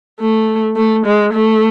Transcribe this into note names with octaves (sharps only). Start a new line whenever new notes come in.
A3
A3
G#3
A3